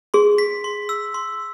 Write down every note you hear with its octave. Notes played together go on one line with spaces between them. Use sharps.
G#4 C6
B6
C6
E6
C6